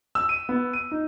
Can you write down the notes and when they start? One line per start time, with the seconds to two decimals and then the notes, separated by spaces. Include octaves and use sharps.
0.15 E6
0.29 D#7
0.49 B3
0.73 D#7
0.91 D#4